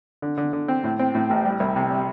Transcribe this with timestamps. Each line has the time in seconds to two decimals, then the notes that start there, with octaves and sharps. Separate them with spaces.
0.22 D3
0.38 D3
0.53 D3
0.68 C4
0.84 A2
0.99 C4
1.15 A2
1.30 A1
1.45 G3
1.60 C2
1.76 C3
1.91 G3